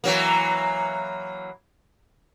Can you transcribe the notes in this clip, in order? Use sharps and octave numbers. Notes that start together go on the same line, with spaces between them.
E3 F#3 A#3